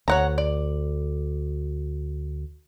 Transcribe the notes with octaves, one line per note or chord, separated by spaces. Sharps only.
D2 C#5 F#5 A#5
D5